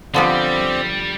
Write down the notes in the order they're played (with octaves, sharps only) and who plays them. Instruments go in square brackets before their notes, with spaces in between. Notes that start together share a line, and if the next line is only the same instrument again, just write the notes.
[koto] D3 F3 B3 [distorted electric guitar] G3 [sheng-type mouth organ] C4 D5